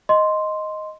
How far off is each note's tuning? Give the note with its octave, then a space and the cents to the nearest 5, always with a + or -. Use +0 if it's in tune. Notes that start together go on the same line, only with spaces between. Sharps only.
D#5 +0 C6 +0